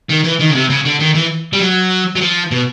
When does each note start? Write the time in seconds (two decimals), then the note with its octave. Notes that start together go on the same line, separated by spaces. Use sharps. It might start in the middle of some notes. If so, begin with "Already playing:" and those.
0.09 D#3
0.24 E3
0.40 D#3
0.49 C#3
0.55 C3
0.70 C#3
0.85 D3
1.00 D#3
1.15 E3
1.53 G3
1.60 F#3
2.15 F#3
2.21 F3
2.51 B2